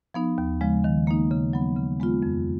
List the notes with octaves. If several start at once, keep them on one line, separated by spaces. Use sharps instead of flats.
F3 B3 D#4
D#2
C#3 F3 G#3
D#3
A#3 D#4
C#3
F#3 B3
C#3
G#3 B3 F4
F2